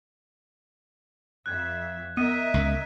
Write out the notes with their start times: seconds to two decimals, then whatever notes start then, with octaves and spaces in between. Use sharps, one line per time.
1.46 F2 E5 F#6 G#6
2.17 B3 A#4 D#5 E5 D#7
2.54 C#2